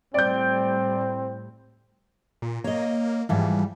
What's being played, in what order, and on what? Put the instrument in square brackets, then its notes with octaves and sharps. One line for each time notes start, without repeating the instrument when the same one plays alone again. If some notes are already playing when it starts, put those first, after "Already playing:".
[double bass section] A2 G3 [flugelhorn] C4 [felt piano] D5 G6
[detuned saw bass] A#2
[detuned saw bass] A#3 [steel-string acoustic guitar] C#5 D#5
[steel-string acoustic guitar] G#2 E3 F3 [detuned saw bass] G3